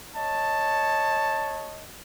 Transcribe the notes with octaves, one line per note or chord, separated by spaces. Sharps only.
C#5 D#5 A5